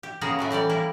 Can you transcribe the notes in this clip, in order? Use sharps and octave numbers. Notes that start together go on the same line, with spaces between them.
G4
C#3 A#3 B3 F#4 G#4 A#5
A2 F#3 A3
E3 G3 G4 D5
G3 A#3 E4